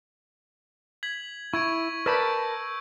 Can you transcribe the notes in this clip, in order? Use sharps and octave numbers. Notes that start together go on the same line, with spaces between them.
G#6 B6 F#7
E4 C#6 G#6 D7
A#4 B4 D5 A5 B5 E6 G6 D7